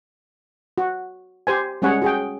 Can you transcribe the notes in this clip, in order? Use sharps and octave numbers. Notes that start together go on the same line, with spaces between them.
F#4
G4 C5 G#5
G3 G#3 C#4 G#4 C#5 F#5
F#4 G#4 G5